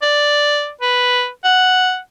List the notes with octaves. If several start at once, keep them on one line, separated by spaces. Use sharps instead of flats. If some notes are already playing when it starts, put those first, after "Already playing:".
D5
B4
F#5